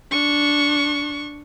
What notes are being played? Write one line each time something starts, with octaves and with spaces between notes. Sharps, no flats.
D4 C#6